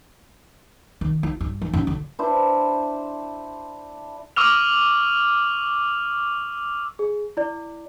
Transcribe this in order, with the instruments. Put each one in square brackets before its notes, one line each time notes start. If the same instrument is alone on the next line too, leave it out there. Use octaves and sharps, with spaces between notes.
[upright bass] D#3
E4
G2
E3
F#2
D3
[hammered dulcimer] D4 E4 C5
[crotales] C#6 D6 E6 F6 F7
[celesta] G#4
E4 D5